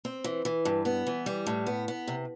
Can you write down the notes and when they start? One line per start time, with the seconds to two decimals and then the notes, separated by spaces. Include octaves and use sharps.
0.05 C4
0.24 E3
0.45 E3
0.65 G2
0.85 B3
1.07 E3
1.26 G3
1.47 A2
1.66 B3
1.88 B3
2.08 C3